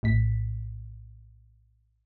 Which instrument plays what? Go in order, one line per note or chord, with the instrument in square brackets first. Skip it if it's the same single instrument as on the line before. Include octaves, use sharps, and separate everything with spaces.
[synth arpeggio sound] A#1 A2 B6